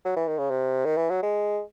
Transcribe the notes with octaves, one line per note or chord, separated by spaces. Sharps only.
F#3
E3
D#3
C#3
C3
D#3
E3
F#3
G#3